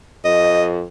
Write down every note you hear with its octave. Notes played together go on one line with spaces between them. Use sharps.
F2 D#5